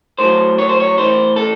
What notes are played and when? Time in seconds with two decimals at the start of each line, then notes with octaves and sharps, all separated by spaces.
0.19 A2 F#3 C5
0.59 C#5
0.69 C5
0.80 C#5
0.97 A2 E3 C5
1.36 A4